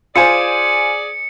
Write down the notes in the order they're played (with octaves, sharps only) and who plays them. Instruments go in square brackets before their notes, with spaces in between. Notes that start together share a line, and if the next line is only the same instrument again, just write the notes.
[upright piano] F4 C5 G#5 [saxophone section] G#4 D5 [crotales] C#7